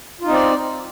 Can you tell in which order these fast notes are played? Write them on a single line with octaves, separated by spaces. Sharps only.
F4 D#4 C4 D5